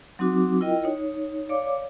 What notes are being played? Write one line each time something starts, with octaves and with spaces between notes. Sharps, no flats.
F#3 C4 D#4 F#4 D6
E4 F4 A#4 D#5 G5
D#4 C#5
C#5 D5 F5 D6